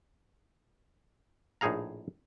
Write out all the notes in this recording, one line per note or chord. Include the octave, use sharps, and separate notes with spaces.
A#1 A2 D#4 G#4 F5 A#5